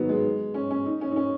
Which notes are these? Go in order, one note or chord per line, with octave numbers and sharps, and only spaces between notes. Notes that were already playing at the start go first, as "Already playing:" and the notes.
Already playing: D#3 F#3 B3
G#3
C#4
C#4
D#4
C#4
D#4
C#4